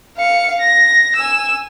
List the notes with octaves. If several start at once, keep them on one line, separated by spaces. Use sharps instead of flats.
F5 C#7
A#6
G#5 E6